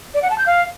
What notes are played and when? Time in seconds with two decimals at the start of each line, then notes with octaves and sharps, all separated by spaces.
0.14 D5
0.22 F#5
0.30 A5
0.38 G6
0.46 F5